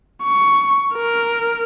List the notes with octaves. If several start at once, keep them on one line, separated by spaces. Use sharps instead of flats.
C#6
A#4